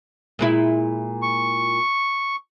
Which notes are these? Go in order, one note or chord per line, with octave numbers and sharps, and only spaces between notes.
A#2 G#3 E4
C#6